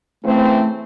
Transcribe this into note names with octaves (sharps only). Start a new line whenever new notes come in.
C#3 E3 A3 C4